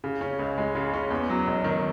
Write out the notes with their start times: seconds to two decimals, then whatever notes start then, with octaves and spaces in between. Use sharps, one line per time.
0.04 C#3
0.21 C#4
0.39 C#2
0.58 G#3
0.75 C#3
0.94 C#4
1.10 E2
1.30 F#3
1.47 E1
1.64 D#3